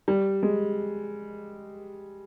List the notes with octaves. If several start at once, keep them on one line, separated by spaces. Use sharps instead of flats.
G3
G#3